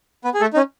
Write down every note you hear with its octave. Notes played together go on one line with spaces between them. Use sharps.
B3 B4
G#4
A3 A4
D#4
C#4